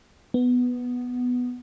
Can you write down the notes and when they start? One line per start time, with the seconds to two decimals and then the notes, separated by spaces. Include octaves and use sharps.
0.34 B3